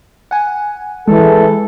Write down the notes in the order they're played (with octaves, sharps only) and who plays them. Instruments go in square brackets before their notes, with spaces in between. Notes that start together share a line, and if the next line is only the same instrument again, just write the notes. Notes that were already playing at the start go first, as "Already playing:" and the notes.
[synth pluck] F#5 G#5
[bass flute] E3 [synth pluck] G#3 [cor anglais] A4